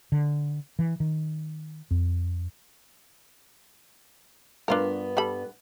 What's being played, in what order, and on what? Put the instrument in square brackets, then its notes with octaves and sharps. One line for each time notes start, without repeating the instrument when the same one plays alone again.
[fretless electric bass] D3
E3
D#3
F2
[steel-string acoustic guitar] G2 B3 [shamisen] D4 F4 A#4
[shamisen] G3 A4 B5